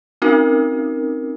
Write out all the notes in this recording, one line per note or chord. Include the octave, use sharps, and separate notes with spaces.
C4 C#4 D#4 F#4 A#4